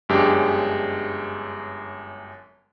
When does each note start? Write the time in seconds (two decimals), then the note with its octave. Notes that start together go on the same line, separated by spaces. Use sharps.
0.09 G1 F#2 G#3 D4 G4